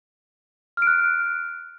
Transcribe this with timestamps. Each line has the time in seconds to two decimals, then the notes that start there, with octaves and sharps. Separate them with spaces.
0.77 F6
0.82 D7
0.87 F#6